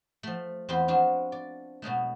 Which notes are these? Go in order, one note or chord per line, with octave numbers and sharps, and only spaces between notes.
F3 A3
E2 C4 F4 B4 C5 C6
F3 D4 F4 F#4
D5
B2 F#3 G#3 A3